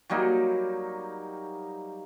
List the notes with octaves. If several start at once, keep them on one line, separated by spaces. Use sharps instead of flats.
F#3 G3 A#3 D#4